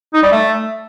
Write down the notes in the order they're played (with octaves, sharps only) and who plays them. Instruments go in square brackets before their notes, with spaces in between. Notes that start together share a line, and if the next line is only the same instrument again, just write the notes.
[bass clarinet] D#4
G3
A3